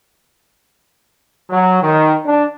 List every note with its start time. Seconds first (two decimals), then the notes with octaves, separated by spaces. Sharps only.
1.50 F#3
1.82 D#3
2.25 D4